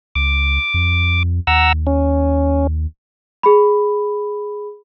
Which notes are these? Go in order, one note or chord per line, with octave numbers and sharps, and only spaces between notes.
C#2 D6
F2
D#2 F#5 A#5 E6
C#4
G#4 B5